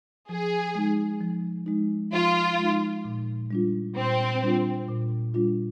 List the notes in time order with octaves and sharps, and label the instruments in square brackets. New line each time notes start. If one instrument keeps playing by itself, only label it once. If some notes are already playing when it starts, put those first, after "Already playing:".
[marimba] F3 [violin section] G#4
[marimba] G#3 D#4
F3
G#3 D#4
[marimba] F3 [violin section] F4
[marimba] G#3 D#4
A#2
G3 D4 F4
[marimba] A#2 [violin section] C4
[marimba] G3 D4 F4
A#2
G3 D4 F4